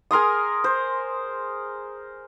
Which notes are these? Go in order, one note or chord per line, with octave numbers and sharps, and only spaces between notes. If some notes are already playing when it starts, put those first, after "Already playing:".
G#4 A#4 C6 D#6
C5